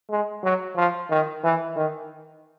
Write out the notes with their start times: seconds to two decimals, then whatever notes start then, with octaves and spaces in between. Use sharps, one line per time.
0.10 G#3
0.44 F#3
0.76 F3
1.10 D#3
1.44 E3
1.76 D#3